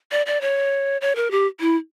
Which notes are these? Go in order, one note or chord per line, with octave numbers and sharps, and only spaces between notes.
D5
D5
C#5
C#5
A#4
G4
E4